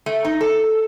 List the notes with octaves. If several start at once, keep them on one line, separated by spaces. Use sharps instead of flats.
A3
D#4
A4